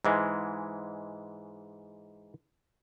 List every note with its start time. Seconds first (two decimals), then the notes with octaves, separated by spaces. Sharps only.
0.05 G#2 E3 G#3